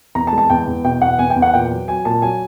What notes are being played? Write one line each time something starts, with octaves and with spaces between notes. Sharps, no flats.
E2 A#5
A5
G#3
A5
E2 G5
E2
B2 G5
E2 F#5
E2 G#5
G5
E2
F#5
A#2 G5
F#3
F#3 G#5
A#2 A5
F#3 G#5